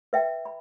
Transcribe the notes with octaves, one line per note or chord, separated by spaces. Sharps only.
B4 E5 G5
B5